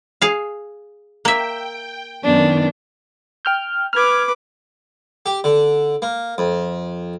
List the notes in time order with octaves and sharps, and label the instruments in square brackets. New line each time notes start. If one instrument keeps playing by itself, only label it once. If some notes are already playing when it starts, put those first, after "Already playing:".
[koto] G#4 F5
[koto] A#3 E5 [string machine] G5
[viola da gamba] F#2 B3 [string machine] D#3 [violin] D4
[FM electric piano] G5 F6 G6
[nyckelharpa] B4 D6 [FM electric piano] F6 G#6
[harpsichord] G4
D3
A#3
F2